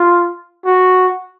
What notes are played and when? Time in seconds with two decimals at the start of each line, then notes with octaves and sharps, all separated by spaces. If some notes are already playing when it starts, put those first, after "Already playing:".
Already playing: F4
0.65 F#4